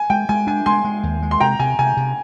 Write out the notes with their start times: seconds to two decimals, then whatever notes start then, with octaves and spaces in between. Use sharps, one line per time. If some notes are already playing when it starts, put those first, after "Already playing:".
Already playing: G#5
0.10 G#3 G5
0.29 G#3 G#5
0.47 D4 G#5
0.66 G#3 G#5 C6
0.85 G#3
1.03 D#2
1.22 G#3
1.31 C6
1.40 C3 G5 A#5
1.60 C3 G#5
1.79 C3 G#5
1.97 C3